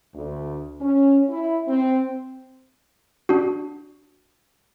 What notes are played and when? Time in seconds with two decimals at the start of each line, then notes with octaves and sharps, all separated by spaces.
0.14 D2
0.81 C#4
1.29 E4
1.67 C4
3.29 D4 F#4